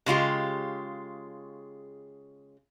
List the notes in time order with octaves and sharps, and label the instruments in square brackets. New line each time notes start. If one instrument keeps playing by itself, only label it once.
[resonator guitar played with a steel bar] C#3 G#3 F4 G4